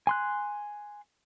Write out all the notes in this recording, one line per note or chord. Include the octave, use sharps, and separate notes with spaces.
G#5 C6 F#6